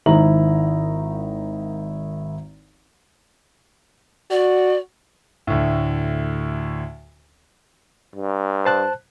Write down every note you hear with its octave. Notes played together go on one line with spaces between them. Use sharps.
G#1 D#3 E4 C5 A#5 F#7
F#4 D5
D2 A2
G2
C5 A5 F#6